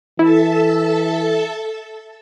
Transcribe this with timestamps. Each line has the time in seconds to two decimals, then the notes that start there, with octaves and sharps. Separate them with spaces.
0.19 E3 E4 A4 E5 A5